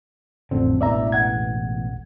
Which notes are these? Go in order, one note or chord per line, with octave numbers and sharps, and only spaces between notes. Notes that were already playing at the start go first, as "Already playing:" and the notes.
A1 F2 D3 C4
E1 A1 E2 D5 E5 A#5
F#5 G#6